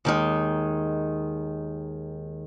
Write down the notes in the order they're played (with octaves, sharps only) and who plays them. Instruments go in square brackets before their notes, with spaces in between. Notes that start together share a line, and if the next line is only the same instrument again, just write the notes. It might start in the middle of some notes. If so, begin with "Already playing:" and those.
[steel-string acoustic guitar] D#2 D#3 G#3